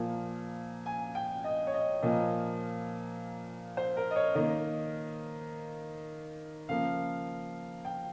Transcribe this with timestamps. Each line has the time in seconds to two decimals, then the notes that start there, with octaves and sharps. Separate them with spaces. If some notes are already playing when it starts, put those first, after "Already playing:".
Already playing: A#2 F3 A#3
0.86 G#5
1.15 G5
1.44 D#5
1.67 C#5
1.74 D#5
2.02 A#2 F3 A#3 D#5
3.77 C5
3.97 A#4
4.11 D#5
4.16 C#5
4.35 D#3 A#3 D#5
6.68 C#3 F3 A#3 F5
7.85 G5